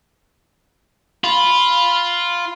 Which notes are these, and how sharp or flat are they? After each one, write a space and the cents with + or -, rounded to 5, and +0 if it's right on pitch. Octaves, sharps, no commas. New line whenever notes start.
F4 +0 B5 +0